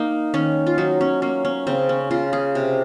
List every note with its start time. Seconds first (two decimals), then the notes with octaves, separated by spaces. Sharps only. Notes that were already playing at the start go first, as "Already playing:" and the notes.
Already playing: A#3 D#4
0.34 D#3 C#4
0.67 F4
0.78 F#3 D#4
1.01 C#4
1.22 A#3 C#4
1.45 C#4
1.67 C#3 C4
1.89 C#4
2.11 C#3 F4
2.33 G#4
2.55 C3